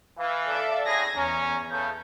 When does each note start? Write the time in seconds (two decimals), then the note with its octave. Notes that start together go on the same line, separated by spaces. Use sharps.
0.18 E3 F5
0.48 A4 D5 E5
0.86 A2 G#4 G#6 A#6
1.15 E2 C#4 A#5
1.71 C#3 A3 G6